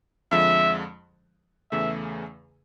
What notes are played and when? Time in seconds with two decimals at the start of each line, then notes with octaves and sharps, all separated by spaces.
0.31 F2 D3 F3 G#3 E5
1.72 E2 C#3 E3 A3 E5